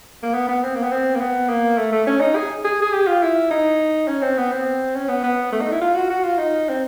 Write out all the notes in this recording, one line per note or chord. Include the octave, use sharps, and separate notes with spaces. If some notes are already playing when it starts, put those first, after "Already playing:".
A#3
B3
B3
C4
A#3
B3
C4
A#3
B3
A#3
A3
A3
C#4
D#4
G#4
G#4
G#4
G4
F4
E4
D#4
C#4
C4
B3
C4
C#4
B3
B3
A3
D#4
E4
F4
F#4
F#4
F4
D#4
C4